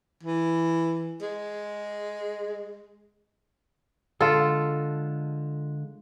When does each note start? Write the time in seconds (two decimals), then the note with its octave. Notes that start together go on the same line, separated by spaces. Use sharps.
0.23 E3
1.21 G#3
4.21 D3 G#3 F4 A4